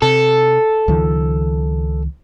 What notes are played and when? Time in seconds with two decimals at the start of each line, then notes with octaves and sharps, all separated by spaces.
0.02 C3 A4
0.88 C#2 D#3 F3